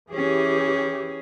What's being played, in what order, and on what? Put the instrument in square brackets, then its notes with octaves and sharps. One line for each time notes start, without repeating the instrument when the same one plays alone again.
[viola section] E3 G4 [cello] C#4 G#4